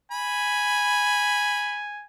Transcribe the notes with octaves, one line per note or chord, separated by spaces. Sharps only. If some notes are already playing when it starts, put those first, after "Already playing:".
G#5 B5